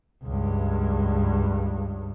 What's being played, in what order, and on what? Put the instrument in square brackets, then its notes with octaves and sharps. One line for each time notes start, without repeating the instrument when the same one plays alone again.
[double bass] C#2 G2